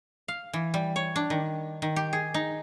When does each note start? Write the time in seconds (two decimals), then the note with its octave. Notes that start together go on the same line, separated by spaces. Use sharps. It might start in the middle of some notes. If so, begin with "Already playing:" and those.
0.28 F5
0.53 E3
0.74 G3
0.96 C#5
1.16 D4
1.30 D#3
1.82 D#3
1.96 G4
2.13 G#4
2.34 D#4